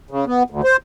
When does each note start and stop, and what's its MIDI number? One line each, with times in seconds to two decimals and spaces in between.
0.11 0.25 49
0.27 0.43 59
0.50 0.61 38
0.64 0.77 72